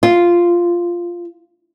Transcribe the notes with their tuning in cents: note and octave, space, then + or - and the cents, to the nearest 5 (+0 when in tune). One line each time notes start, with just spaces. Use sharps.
F4 -5